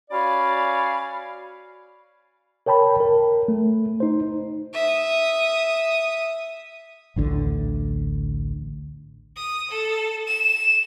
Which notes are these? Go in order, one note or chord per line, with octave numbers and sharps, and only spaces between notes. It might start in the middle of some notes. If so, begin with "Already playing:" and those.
C#4 F#4 D5 F5 G#5 B5
A#4 C#5 G5 A5 B5
A#4
A3
D#4 C5
E5 D#6
A1 D2 D3
D#6
A4
E7